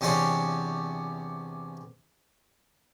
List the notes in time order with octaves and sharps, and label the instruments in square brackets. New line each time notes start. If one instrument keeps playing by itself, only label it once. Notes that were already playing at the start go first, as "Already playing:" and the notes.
[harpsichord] E2 C3 C#4 D4 C#5